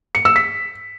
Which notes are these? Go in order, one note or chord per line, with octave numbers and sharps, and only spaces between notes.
C#7
E6
B6